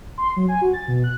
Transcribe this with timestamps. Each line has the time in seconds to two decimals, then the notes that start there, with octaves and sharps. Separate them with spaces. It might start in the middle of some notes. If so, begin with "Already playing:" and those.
0.18 C6
0.37 F#3
0.48 G#5
0.61 F#4
0.73 A6
0.88 B2
1.04 F#6